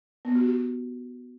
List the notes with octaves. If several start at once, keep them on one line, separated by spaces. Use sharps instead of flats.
B3
F#4
G4